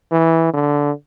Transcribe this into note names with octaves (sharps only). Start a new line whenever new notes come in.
E3
D3